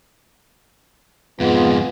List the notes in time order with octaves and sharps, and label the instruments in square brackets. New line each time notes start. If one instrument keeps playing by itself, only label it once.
[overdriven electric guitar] F2 G#2 [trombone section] G#3 B3 F4